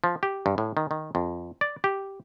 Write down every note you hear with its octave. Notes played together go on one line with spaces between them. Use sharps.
F3
G4
G2
A2
D#3
D#3
F2
D5
G4